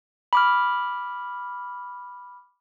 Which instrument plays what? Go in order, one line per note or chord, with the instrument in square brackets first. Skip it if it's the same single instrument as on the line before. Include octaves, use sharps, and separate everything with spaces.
[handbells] B5 D6 F6